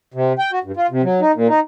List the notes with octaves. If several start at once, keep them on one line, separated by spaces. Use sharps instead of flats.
C3
G5
F#4
G2
F4
C3
F#3
D#4
A#2
D#4